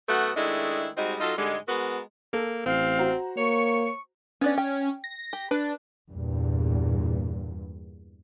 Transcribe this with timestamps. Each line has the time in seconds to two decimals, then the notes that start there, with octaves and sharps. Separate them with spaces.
0.08 F#2 A3 B3 F#4 F#5
0.36 D#3 G#3 A3 D4 E4
0.96 G3 G#3 C4 D#4 F#4
1.20 F#3 D#4 F4 A4
1.37 G#2 D3 G3 G#3
1.67 G#3 B3 F#4 A#4
2.33 A#3 A4
2.66 A1 C4 F5
2.99 F#4 C5 A#5
3.37 A#3 C#5 C#6
4.41 B3 C#4 D4 D5
4.58 G5
5.04 A#6
5.33 G4
5.51 D4 B4
6.11 E2 G2 A#2